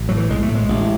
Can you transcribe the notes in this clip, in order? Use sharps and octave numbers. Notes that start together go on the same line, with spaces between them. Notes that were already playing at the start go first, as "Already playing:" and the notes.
Already playing: A1
A2 F#3
E3
B1 G#3
A3
A2
G#3
A1